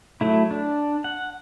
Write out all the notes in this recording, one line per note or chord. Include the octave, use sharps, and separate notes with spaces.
F#3 A3 E4
D4
F#5